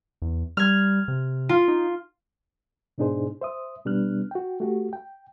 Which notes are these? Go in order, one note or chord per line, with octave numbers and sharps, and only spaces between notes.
E2
G3 F6 G#6
C3
F4
D#4
G#2 B2 D4 D#4 G#4 C5
C5 E5 D#6
B2 G3 B3 D4 F6 F#6
F#4 G5
A3 F#4 G4
G5